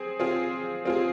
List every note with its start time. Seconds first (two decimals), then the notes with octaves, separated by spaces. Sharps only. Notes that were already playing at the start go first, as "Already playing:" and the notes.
Already playing: C4 G#4
0.20 C4 F4 G#4
0.85 C4 F4 G#4